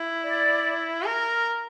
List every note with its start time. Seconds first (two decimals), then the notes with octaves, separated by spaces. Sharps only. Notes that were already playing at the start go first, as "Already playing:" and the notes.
Already playing: E4
0.23 D5
1.04 A#4